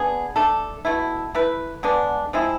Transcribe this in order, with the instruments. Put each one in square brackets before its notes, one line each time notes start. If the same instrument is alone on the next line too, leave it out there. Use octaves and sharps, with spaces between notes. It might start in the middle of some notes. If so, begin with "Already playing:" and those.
Already playing: [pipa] B3 D4 G#4
A3 D4 A4
B2 A3 E4
A3 E4 B4
D3 G#3 B3 D4
F3 G#3 C4 E4